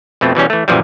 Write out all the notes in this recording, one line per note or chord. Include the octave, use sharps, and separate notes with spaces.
F2 B2 A3 C4
B2 E3 G3 C#4
E3 A3
F#2 A#2 E3 F3 G3